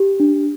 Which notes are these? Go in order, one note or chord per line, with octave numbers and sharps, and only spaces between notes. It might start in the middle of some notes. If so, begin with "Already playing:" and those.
Already playing: G4
D4